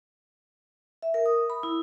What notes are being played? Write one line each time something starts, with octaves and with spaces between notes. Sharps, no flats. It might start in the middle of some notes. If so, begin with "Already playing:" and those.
E5
A#4
D#6
B5
E4